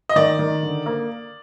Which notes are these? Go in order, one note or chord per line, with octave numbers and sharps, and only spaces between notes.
D#5
D#3 D5
D#3
D3
A#3